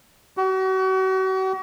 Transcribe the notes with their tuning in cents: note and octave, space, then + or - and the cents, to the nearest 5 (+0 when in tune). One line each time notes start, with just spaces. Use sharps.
F#4 +40